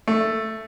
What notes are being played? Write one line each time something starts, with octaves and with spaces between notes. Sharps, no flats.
A3